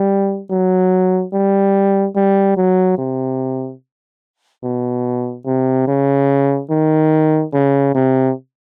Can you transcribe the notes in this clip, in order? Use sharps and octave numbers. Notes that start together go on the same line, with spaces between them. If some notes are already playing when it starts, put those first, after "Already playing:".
Already playing: G3
F#3
G3
G3
F#3
C3
B2
C3
C#3
D#3
C#3
C3